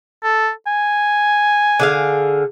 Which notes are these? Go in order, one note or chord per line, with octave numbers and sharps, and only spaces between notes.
A4
G#5
D3 G#4 F5